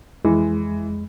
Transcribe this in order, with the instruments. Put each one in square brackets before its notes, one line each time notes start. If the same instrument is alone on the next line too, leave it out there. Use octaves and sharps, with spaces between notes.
[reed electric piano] F2 G#3 [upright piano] E3